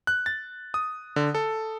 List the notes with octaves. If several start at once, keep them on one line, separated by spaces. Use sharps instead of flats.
F#6
A6
D#6
D3
A4